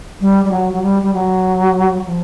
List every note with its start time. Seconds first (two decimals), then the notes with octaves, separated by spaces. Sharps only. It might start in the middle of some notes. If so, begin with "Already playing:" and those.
0.21 G3
0.45 G3
0.51 F#3
0.73 F#3
0.82 G3
1.02 G3
1.14 F#3
2.06 F3